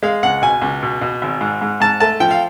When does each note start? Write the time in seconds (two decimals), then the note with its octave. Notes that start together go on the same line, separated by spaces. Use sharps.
0.03 G#3 F5
0.23 C#2 F#5
0.42 B2 G#5
0.61 C#2
0.82 B2
1.01 B2
1.22 G#1
1.41 G#2
1.61 G#2
1.80 G#2 A5
2.00 A3 A5
2.20 F3 G5
2.31 F5